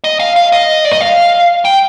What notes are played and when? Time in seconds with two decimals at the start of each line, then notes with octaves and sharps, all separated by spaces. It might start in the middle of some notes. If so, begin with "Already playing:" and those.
0.04 D#5
0.20 F5
0.36 F5
0.52 D#5
0.85 D5
0.93 D#5
1.01 F5
1.65 G5